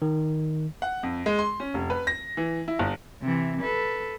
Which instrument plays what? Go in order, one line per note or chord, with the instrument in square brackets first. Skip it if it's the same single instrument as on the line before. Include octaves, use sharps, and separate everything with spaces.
[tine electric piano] D#3
[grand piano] F#5
F2
G#3
C6
C#4
F1
B4
A#6
E3
E4
G1
[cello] C3 E3
A4 B4